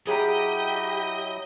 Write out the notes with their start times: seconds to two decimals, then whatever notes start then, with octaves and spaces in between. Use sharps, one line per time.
0.07 F#3 E4 G4 G#4 D#5 A#5 D#6